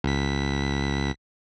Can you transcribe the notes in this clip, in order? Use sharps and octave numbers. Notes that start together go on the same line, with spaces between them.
C#2 B6